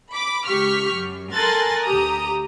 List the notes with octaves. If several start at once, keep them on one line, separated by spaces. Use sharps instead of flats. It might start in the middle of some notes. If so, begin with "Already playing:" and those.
B5 D6
C#2 G4 C#6 F6 B6
F#2
A4 A#4 G#5 C6 F#6 A6
D2 G4 A#5 D#6